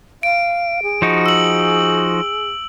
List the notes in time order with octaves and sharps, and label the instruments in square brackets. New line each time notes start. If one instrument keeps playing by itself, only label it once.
[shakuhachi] F5 [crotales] D7
[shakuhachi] G#4
[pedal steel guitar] F3 D#4 F#4
[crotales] E6 F#7